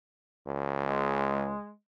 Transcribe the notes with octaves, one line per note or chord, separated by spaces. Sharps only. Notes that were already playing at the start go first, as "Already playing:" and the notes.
C#2
G#3